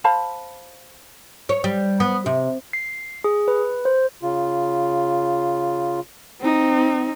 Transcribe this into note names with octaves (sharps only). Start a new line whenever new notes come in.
C5 F5 A5 B5
C#5
G3
B3
C3
C7
G#4
B4
C5
C#3 F4
C4 D#4